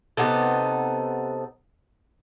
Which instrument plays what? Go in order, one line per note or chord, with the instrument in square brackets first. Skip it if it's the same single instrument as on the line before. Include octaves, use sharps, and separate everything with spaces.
[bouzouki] C3 B3 D#4 A4